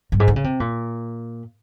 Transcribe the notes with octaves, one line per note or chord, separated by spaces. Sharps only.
G2
G#2
D3
C#3
C3
A#2